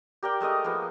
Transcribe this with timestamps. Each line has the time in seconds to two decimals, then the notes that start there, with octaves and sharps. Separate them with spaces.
0.23 G4 A#4 D5 G5
0.40 G#3 A3 A#4 D#5
0.64 F3 G#3 A#3 B3